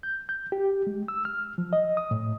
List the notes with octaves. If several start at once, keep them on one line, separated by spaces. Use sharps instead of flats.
G6
G6
G4
G#3
E6
F6
F3
D#5
D#6
A2